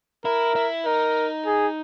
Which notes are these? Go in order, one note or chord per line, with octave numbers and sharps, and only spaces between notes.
E4 A#4
E4
D#4 A#4
G#4